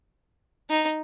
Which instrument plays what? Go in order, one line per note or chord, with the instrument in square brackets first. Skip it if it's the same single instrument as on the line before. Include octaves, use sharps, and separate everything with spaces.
[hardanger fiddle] D#4